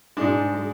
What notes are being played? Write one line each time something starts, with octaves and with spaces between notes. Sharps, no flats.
G#2 G#3 D4
G#3